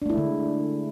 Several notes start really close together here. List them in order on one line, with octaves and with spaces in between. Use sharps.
D4 A3 E4 G#3 D3